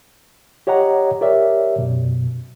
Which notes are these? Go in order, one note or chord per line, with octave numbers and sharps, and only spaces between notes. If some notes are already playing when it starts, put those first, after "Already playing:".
G4 C#5 D#5 F#5 A#5
G4 A#4 C#5 D5 E5
F#2 B2